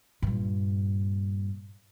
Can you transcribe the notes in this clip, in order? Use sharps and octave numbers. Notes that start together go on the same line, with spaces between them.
G2 A#2